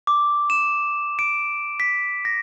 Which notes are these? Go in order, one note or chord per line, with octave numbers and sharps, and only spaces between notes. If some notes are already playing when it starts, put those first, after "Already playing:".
D6
E7
D7
B6
A#6